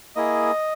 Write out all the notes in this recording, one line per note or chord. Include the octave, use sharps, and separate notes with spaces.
A#3 E4 G#4 D#5